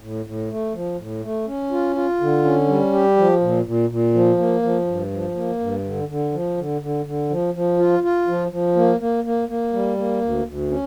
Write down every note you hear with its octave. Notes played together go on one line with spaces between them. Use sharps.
A2
A2
A3
F3
A2
A3
C#4
F4
F4
D3
C#4
G3
G4
F3
A#2
A#2
A#2
F3
A#3
F3
G2
F3
A#3
G2
D3
D3
F3
D3
D3
D3
F3
F3
F4
F4
F3
F3
A#3
A#3
A#3
A#3
G3
A#3
D2
D2
C#4